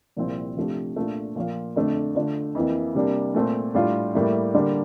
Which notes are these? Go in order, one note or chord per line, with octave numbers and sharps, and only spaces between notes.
C2 A#2 F3 C4 E4
C3 F3 A3 D4 G4
A#2 A3 D4 F4
A#2 F3 A#3 F4
F2 D3 A3 D4
D3 A3 D4 F4
F2 E3 A#3 E4
C3 G3 A#3 D4
A#2 A3 C4
A2 G3 D4 F4
A2 G3 A#3 E4
D3 G3 A#3 D4